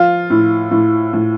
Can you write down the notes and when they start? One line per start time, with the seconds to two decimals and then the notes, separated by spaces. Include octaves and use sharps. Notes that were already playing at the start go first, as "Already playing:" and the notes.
Already playing: F3 F4
0.30 A2
0.71 A2
1.13 A2